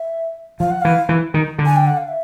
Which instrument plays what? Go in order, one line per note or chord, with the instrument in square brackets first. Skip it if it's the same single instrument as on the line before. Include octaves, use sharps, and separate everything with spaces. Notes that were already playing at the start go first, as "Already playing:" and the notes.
Already playing: [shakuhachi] E5
[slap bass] F3 [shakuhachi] F5
[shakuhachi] F#5
[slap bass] E3 [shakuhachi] F5
[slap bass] E3
D#3
D3
[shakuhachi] G#5
G5
F#5
F5
E5